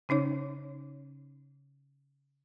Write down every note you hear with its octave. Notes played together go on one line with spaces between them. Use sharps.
C#3 C#4 D#4 C#5